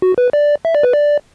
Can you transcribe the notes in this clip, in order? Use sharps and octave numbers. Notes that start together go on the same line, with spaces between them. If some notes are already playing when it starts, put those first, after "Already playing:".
F#4
B4
D5
E5
D5
B4
D5